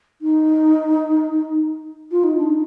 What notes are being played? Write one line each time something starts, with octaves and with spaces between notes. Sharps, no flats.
D#4
F4
D#4
D4
D#4